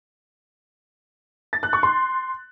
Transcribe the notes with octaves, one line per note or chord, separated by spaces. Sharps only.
A6
F#6
C#6
C6